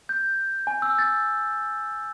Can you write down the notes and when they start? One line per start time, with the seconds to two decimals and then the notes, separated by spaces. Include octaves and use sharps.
0.09 G6
0.67 G#5
0.82 E6
0.99 A6